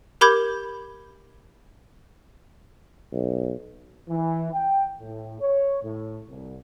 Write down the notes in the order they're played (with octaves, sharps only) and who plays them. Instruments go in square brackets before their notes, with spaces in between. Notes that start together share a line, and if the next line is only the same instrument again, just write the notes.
[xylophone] G4 A#4 B5 D6 G6 G#6
[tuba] B1
[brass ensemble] E3
G5
A2
C#5
A2
C2